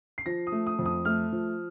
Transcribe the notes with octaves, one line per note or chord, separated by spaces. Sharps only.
C7
F3 A#6
D#6
A3
D#6
F2
D#6
A3 F6
F3